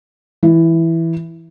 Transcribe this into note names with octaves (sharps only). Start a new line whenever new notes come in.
E3